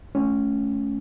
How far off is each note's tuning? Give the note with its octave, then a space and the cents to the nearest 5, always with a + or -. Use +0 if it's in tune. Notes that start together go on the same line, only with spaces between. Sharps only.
A3 -25 C#4 +0